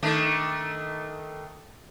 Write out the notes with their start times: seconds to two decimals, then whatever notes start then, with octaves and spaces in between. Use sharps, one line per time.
0.03 D#3 A3 D4